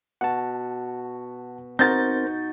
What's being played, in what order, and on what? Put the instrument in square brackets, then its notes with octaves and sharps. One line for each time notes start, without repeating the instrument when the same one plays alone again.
[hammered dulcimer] B2 F#4 [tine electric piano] F#5 A5
[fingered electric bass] C4 [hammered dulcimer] D#4 F#4 [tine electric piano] A#4 C5 A#6 [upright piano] G6 A6